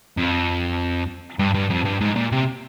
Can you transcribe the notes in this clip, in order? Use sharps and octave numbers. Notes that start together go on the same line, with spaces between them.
F2
G2
G2
F2
G2
G#2
A#2
C3